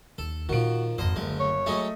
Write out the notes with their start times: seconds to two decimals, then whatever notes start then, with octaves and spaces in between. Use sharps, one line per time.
0.18 D#2 A4
0.49 A#2 D#3 F3 B3 F#4 D7
0.98 G#1 F2 F#3 C5 D#5
1.16 F#1 D2 G3 G#3
1.40 C#5
1.66 F#3 G#3 A3 C#4 D#5